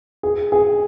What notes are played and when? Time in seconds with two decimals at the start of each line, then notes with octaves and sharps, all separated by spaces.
0.23 G#4
0.52 G#4